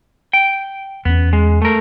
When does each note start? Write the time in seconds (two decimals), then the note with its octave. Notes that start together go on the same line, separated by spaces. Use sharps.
0.33 G5
1.05 E2 B3 C#4
1.33 G#3
1.62 A3 A#4